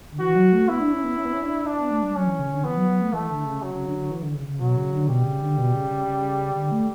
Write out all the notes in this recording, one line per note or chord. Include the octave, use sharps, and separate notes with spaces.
D3
E3 F#4
F#3
A3
B3 E4
D4
C#4
B3
C#4
B3
C#4
D4
D4
B3
A3
G3
F#3 C#4
E3
C#3
D3
E3 B3
F#3
F#3
A3
E3 A3
D3
C#3
C#3 F#3
C#3
D3
D3
E3
D3
C#3
C#3
B2 F#3
C#3
D3
B2 G3
C#3
D3
B2
C#3
C#3
C#3
D3
A3